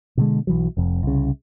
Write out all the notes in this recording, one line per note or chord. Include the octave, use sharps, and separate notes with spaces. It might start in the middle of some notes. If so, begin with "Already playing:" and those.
B2 D3 G#3
B1 E3 F#3
F1 F2
C2 C#3